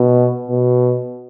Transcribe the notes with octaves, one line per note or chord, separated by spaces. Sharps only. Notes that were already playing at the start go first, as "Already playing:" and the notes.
Already playing: B2
B2